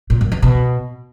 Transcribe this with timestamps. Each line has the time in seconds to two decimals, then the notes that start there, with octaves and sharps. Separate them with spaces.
0.10 A#2
0.21 F#2
0.32 E2
0.42 B2